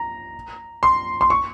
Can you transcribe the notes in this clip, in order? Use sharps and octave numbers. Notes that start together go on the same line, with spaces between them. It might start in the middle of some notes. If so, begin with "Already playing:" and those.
Already playing: A#5
C6
C6
C#6